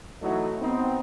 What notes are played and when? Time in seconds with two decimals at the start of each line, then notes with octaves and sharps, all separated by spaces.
0.21 E3 F#3 A3 D#4 E4 F#4
0.60 B3 C4 D#4